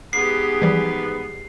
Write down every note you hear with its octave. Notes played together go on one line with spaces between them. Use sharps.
G#2 B3 G4 G#4 C7
E3 F3 G3